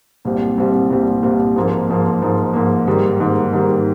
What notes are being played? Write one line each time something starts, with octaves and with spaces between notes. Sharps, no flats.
C2 A#2 G3 C4
C2 A#2 G3 C4
C2 A#2 G3 C4
C2 A#2 G3 C4
G#2 F3 A#3
G#2 F3 A#3
G#2 F3 A#3
G#2 F3 A#3
G#2 D#3 G3 A#3
G#2 D#3 G3 A#3
G#2 D#3 G3 A#3